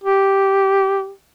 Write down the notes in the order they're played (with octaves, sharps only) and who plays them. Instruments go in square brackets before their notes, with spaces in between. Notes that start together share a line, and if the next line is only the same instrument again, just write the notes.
[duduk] G4